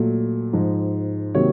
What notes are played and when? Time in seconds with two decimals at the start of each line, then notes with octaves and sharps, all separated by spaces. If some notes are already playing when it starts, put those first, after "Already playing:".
Already playing: A#2 F#3 A3
0.53 G#2 F3 G#3
1.35 C3 D#3 F#3 A#3 C#5